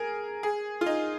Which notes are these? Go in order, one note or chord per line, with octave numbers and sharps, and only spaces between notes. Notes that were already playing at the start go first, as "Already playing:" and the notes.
Already playing: G#4 A#4
G#4
F4
D#4